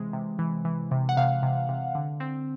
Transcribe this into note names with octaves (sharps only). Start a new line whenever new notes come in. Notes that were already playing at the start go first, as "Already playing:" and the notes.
Already playing: C3 E3 G#3
C3
E3
E3
C3
F#5
C3 F5
C3
C3
D3
C4